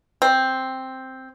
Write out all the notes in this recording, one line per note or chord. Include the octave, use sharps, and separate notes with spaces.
C4